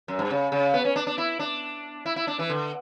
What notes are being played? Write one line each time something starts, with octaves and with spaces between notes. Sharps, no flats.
F#2
G2
C#3
C#3
B3
C#4
D4
D4
E4
D4
E4
E4
D4
E3
D3